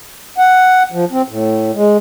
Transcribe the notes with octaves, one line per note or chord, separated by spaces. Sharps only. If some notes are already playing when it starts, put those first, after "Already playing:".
F#5
F3
C4
A2
G#3